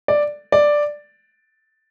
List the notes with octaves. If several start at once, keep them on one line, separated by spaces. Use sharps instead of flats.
D5
D5